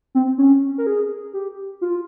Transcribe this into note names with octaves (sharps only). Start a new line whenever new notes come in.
C4
C#4
A#4
G#4
G4
F4